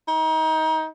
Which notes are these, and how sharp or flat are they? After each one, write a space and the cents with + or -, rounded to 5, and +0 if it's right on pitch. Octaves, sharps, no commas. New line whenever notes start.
D#4 +30